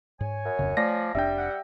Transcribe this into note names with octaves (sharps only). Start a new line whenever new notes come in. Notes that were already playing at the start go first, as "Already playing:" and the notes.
G#2 C#5 G#5
F#2
D1 F2 C#3
F3 A3 D5 A#6
F1 G3 D4 E5 G5
F#5